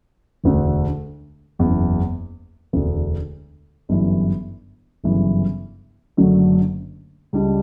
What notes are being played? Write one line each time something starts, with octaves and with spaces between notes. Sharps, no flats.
E1 D2 D3 A3
F#1 E2 C#3 E3
E1 D2 D3
G1 F#2 E3
G1 F#2 C#3 E3
F#1 F#2 D3 F#3 A3
C#2 C#3 G3 D4